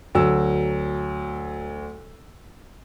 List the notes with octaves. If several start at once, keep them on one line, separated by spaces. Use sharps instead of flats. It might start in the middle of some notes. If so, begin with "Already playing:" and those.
D2 F#3 E6